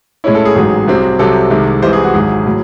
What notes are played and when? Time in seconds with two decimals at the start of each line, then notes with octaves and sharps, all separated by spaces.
0.24 A2 G#3 C#4 E4 C#5
0.35 A4
0.45 G#4
0.56 A1 G#2 F#3
0.87 C2 C3 F#3 C4
1.19 C2 C3 F#3 C4 A4
1.50 C2 C3 D#3 G#3
1.83 C2 C3 E3 G#3 C5
1.93 G#4
2.04 F#4
2.14 G#1 G#2 F#3 G#4
2.46 A2 F#3